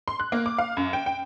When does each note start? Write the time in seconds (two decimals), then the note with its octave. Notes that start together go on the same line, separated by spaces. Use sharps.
0.08 C6
0.20 F#6
0.32 A#3
0.46 D6
0.58 F5
0.77 F#2
0.93 G5
1.06 G5